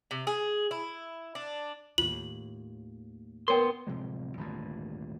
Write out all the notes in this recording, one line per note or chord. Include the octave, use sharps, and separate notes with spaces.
C3
G#4
E4
D4
D#2 A2 F4 F#7
B3 A#4 C#5 G5 C6
D1 C3 F3 G#3
G#1 D2 G2 A#2